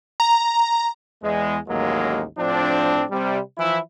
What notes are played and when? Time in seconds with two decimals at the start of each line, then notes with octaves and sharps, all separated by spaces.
0.20 A#5
1.23 E2 G#3
1.68 A1 D#2 F#3 G#3 A#3
2.38 A2 F3 C4 D4
3.11 C3 G3
3.58 E3 F3 E4